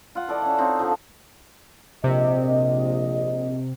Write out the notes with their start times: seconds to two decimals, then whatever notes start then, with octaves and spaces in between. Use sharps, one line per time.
0.15 F4 F#5
0.28 E3 A4 D5 D#5
0.42 E3 C#4
0.58 C4 D#4 C#5 F5
0.79 D3 F3
2.04 A#1 C3 D#5